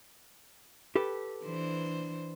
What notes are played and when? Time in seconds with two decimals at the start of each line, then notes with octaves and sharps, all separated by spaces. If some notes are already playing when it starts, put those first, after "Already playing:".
0.96 G4 A4 B4
1.45 E3 D4 C5